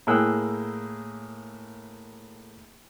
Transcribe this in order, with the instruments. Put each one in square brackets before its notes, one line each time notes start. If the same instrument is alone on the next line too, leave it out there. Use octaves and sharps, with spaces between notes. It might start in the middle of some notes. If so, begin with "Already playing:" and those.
[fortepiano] A2 A#3 G#4 G5 E6 F#6